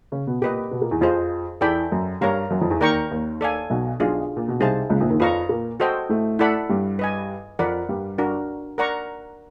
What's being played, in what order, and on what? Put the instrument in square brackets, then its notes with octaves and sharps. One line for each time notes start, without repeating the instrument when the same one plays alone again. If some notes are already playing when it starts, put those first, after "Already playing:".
[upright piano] C#3 C#4
B2 B3
[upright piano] A#2 A#3 [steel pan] G4 B4 D#5
[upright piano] B2 B3
A#2 A#3
E2 E3
[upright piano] F2 F3 [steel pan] F4 G#4 C5 D#5
[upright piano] E2 E3 [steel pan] A4 D5 G5 B5
[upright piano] F#2 F#3
[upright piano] G2 G3 [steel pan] A#4 C#5 F5 A#5
[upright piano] F#2 F#3
F2 F3
E2 E3
[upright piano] D#2 D#3 [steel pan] A#4 D5 G5 A#5 C#6
[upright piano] D#2 D#3
[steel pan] A4 D5 F5 G#5
[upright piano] B1 B2
[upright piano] B1 B2 [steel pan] D4 F4 G#4
[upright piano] A#2
B2
[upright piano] C2 C3 [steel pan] D#4 G#4 C5 F5 A5
[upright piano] C#2 C#3
A#1 A#2
D#2 D#3
[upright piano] F2 F3 [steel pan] B4 D5 F5 A#5 C#6
[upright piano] A#2 A#3
[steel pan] F#4 A4 C5 D#5 G5
[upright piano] A2 A3
[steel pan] E4 A4 D5 F#5 B5
[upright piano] G2 G3
[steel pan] B4 D#5 G#5
[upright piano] F2 F3 [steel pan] A#4 D5 F#5 B5
[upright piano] G2 G3
[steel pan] D4 F#4 A#4
A#4 D5 F#5 A#5 C#6